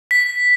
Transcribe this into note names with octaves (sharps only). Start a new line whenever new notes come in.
B6